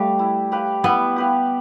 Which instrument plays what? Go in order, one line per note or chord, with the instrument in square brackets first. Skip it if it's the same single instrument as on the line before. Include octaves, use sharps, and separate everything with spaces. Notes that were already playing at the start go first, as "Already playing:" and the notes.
Already playing: [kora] G3 A3 [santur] G4 B4 F5
[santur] E4
G4 B4 F5
[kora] B3 [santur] E4
[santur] G4 B4 F5